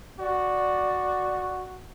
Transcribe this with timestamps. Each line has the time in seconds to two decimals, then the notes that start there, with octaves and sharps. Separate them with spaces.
0.20 F#4 D5